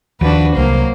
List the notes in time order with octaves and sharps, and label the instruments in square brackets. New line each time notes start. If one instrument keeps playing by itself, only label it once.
[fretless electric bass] D#2 F3 [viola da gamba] D4 F#4 B4
[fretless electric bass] C2 [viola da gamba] F#3 A#3 C5